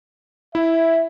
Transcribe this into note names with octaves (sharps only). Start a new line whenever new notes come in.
E4 E5